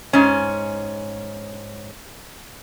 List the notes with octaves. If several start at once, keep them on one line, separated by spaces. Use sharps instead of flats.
G#2 C#4